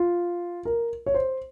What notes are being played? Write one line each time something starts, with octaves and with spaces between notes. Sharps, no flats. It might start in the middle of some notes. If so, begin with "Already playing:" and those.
Already playing: F4
A#4
C#5
C5